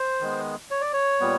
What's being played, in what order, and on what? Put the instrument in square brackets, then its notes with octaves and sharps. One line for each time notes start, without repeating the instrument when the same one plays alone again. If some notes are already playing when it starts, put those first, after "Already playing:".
Already playing: [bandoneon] C5
D#3 G#3 B3
C#5
D5
C#5
A#2 G3 B3